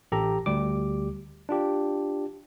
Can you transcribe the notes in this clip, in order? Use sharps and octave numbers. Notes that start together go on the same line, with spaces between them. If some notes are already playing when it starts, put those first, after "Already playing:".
A1 G4 A4 A#5
D2 G3 G4 D6
D4 F4 G4